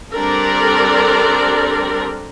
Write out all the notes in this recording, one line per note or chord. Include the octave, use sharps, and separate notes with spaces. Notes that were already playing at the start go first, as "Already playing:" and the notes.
G3 C4 D4 A4 A#4 D5